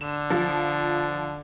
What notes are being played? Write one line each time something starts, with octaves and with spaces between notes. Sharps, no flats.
D3 E7
F3